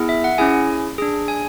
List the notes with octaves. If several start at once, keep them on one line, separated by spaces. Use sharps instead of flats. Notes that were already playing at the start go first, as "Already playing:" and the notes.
Already playing: B3 E4 G#4
E5
F#5
C#4 E4 G#4 G#5
D4 G#4
G#5